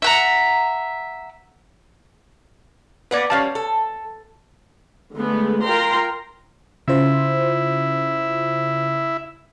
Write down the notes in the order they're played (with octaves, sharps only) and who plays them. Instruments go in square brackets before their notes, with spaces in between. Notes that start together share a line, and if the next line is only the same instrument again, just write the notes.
[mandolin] E5 F#5 A#5
[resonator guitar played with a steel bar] A#3 B3 F#5 [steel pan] B4 D5
[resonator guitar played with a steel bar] F3 G3 C#4 [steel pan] C#5 F5 A5
[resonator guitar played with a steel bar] A4
[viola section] D3 G#3 A3 B3
F4 A#4 G5 A#5 C6
[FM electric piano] C#3 F4 C5 [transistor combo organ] E4